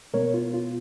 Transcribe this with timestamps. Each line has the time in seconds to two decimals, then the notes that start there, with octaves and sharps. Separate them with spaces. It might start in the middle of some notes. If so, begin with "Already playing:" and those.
0.13 B2 G#3 B3 A#4 C#5
0.34 F4
0.54 F4